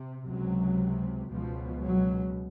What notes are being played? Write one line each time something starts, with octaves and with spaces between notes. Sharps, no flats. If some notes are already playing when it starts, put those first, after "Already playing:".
Already playing: C3
C#2 C3 F#3
C#2 B2 F3
F#3